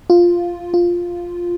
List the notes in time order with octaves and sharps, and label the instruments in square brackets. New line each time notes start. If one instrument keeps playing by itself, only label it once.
[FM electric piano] F4
F4